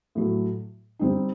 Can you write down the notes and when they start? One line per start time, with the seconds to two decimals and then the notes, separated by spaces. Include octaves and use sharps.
0.15 A2 F#3 A3
0.99 D3 G3 C4 D#4